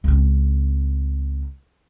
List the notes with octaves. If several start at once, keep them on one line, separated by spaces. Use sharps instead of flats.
C#2 C4